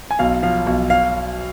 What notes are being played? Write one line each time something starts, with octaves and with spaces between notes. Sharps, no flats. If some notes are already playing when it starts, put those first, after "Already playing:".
G#5
B1 F5
F3 F5
B1
F5